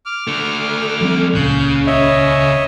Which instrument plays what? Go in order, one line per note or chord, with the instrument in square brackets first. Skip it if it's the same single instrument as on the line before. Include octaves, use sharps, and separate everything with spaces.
[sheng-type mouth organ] D6 F6
[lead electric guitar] D3 A3
[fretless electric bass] F3 G3 C4
[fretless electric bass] D#1 C#2 A#2 [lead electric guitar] C#3 [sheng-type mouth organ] F#6 G6
[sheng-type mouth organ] C#5 D#5 E5